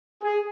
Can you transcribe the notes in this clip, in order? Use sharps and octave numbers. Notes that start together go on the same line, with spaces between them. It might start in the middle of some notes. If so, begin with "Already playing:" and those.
G#4